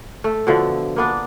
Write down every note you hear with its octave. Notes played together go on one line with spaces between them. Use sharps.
A3
B2 D3 F3
A#3 B3 D4